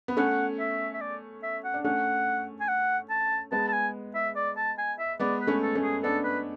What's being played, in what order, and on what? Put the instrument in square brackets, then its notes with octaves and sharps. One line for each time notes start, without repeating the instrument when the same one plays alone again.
[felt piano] B3
[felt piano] A3 C#4 [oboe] F#5
[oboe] E5
E5
D5
E5
F#5
[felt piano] D4
[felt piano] A3 C#4 [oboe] F#5
[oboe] G#5
F#5
A5
[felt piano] G#3 B3 [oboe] A5
[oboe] A5
G#5
E5
D5
A5
G#5
E5
[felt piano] G#3 B3 [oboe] D5
[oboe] B4
[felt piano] A3 C#4
[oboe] A4
[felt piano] A3 C#4
[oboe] G#4
[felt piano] B3 D4 [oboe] A4
[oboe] B4